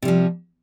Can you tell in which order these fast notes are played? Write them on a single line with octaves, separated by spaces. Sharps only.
C3 G3 F3